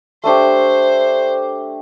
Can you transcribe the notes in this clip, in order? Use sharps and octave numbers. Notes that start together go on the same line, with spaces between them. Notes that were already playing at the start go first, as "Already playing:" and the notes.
A3 D4 G4 C5